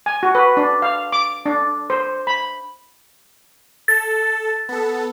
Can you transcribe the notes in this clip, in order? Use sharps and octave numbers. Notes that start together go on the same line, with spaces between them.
G#5
F#4
B4
D4
F5
D6
D4
C5
B5
A4 A6
B3 A4